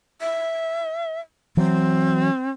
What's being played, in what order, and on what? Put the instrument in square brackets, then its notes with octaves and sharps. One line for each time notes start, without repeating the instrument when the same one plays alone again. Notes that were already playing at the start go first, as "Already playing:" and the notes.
[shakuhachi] E5
[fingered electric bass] E3 F#3 [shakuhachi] C4